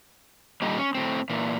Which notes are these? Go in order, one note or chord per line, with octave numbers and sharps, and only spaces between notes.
A#2 D3 G3 D#4
C#4
A2 C4
A#2 E3